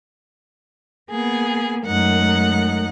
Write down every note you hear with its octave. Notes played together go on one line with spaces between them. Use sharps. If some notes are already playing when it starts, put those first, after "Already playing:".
A#3 B3 G#4
F#2 G#3 A3 D#4 A#4 F#5